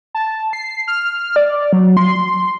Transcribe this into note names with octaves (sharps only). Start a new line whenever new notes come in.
A5
C7
F6
D5
F#3
C6